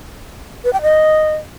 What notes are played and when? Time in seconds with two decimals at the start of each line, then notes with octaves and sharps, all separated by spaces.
0.64 B4
0.73 G5
0.82 D#5